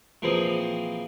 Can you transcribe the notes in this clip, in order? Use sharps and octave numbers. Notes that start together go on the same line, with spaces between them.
A#2 E3 F3 C4 G#4